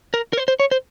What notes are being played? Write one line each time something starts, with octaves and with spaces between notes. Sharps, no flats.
A#4
A#4
C5
C5
C#5
C5